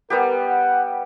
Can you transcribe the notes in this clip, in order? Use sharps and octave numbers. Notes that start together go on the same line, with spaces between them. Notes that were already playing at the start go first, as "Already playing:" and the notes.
G3 B3 G4 A#4
F#5